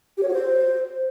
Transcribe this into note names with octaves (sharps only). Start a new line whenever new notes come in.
G4
C#5
F#4
C5